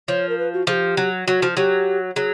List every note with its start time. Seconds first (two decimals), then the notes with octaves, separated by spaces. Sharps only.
0.08 F3 C#5
0.29 A#4
0.38 B4
0.53 F#4
0.67 F3 G#4
0.72 G4
0.97 F#3
1.27 F#3 F#4
1.42 F3
1.57 F#3 G4
2.16 F#3 G#4